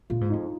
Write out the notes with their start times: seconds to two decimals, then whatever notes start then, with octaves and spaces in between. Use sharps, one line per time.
0.10 A#2 F4
0.21 G#2
0.29 F2 D#4